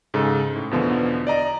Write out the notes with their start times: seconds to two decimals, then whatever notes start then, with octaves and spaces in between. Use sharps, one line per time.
0.14 G#2 C#3 A4
0.56 A2
0.71 E2 B2 D3 F3 B3
1.27 D5 D#5 A#5